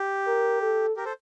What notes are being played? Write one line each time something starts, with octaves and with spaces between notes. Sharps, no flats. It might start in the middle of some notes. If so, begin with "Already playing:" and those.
Already playing: G4
A#4
A4
G4 A#4
A4 C5